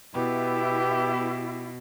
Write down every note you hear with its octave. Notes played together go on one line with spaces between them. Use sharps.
B2 B3 E4 G4